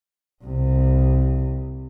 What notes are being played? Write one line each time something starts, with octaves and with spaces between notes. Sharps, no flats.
C2 C3